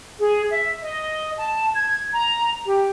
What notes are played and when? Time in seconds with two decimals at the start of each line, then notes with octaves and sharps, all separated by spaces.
0.19 G#4
0.51 E5
0.81 D#5
1.37 A5
1.73 G#6
2.13 A#5
2.65 G4